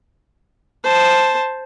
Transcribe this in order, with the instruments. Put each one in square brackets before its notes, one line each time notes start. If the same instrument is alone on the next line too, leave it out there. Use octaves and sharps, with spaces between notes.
[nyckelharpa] C5 A5